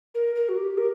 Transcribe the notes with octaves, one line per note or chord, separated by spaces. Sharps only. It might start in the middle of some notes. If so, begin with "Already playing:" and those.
A#4
A#4
F#4
G4
A#4